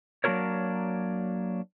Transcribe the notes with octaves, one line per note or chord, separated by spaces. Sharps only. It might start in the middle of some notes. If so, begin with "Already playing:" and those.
F#3 A#3 D4 F#4 A#4 C#5